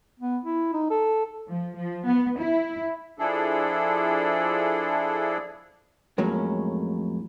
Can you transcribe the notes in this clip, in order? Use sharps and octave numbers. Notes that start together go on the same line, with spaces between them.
B3
E4
D#4
A4
F3
F3
B3
E4
F3 D4 E4 G#4 A4
F2 A2 F#3 G#3 A#3 C#4